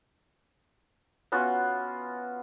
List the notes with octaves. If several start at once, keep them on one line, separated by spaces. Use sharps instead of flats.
B3 C#4 F4 F#4